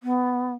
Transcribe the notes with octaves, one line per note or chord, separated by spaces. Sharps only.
B3